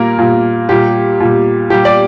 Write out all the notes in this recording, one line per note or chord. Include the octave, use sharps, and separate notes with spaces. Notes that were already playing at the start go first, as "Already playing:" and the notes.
Already playing: A#2 G3 A#3 A#4
A#2 G3
A#2 G3 G4
A#2 G3
A#2 G3 G4
D5